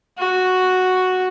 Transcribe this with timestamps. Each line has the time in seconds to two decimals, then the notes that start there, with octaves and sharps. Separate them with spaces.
0.19 F#4